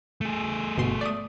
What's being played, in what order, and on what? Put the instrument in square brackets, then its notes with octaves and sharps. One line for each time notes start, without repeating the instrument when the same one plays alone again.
[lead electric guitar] A3 G#4
[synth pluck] G1 B2 C6
D5 D#6